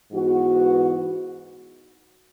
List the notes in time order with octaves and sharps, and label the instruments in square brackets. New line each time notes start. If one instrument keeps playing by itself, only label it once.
[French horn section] G#2 E3 B3 F#4